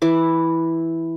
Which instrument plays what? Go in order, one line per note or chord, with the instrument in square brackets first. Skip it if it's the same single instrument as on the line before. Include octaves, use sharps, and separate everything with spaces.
[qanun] E3 E4 D6